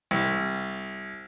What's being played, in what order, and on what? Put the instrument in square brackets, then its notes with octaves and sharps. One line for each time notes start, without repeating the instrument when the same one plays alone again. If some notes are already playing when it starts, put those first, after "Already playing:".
[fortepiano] C2